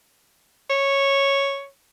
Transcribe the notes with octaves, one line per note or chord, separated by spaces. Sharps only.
C#5